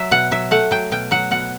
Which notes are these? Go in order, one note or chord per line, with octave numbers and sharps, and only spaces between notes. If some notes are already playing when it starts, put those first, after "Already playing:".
Already playing: F#3 E5
B2 F#5
F#3 E5
A3 F#5
F#3 G5
B2 G5
F#3 F#5
B2 F#5